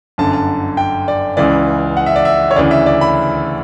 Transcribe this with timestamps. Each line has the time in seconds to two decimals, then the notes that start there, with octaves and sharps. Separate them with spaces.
0.18 G1 F#2 D3 A5
0.33 A5
0.77 G5
1.08 D5
1.37 C#2 C#3 E3 D5
1.97 F#5
2.06 E5
2.16 D5
2.25 E5
2.51 C#5
2.56 D2 C#3 E3 D5
2.71 E5
2.86 D5
3.01 B5